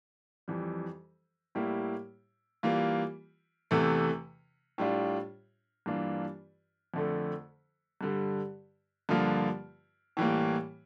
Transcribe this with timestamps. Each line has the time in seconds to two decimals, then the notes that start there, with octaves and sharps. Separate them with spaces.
0.48 F2 E3 G3
1.55 A2 G3 A#3 E4
2.63 E3 G3 A#3 F4
3.71 E2 C3 E3 A3
4.78 A2 G3 D4 F4
5.86 G2 E3 A#3 D4 F4
6.94 F2 D3 A3
8.01 G2 D3 G3
9.09 G2 D3 F3 A#3 F4
10.17 A2 E3 G3 A#3